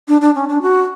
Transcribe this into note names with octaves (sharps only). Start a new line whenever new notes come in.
D4
D4
C#4
D4
F#4